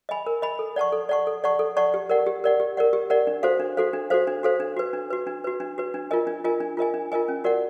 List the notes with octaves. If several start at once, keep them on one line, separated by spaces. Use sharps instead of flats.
D#5 G#5 B5
A#4
D#5 G#5 B5
A4
D5 F#5 A5 C#6
A4
D5 F#5 A5 C#6
A4
D5 F#5 A5 C#6
A4
D5 F#5 A5 C#6
G4
A#4 D5 F#5
G4
A#4 D5 F#5
G4
A#4 D5 F#5
G4
A#4 D5 F#5
D4
F#4 A4 C5 F5
D4
F#4 A4 C5 F5
D4
F#4 A4 C5 F5
D4
F#4 A4 C5 F5
D4
F#4 B4
D4
F#4 B4
D4
F#4 B4
D4
F#4 B4
D4
F4 A#4 D#5 G#5
D4
F4 A#4 D#5 G#5
D4
F4 A#4 D#5 G#5
D4
F4 A#4 D#5 G#5
C#4
F#4 A#4 D5 F#5